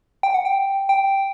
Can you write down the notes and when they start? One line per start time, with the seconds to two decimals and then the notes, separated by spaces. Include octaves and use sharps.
0.23 G5
0.34 F#5
0.45 G5
0.89 G5